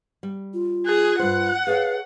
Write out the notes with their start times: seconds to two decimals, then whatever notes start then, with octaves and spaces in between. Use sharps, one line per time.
0.23 G3
0.54 F4
0.86 G#4 F#6
1.19 G2 C5 F#5
1.67 G#4 A4 B4 C#5 F5